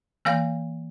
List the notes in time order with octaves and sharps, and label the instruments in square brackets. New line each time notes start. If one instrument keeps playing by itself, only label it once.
[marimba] E3 A#3 F5 G6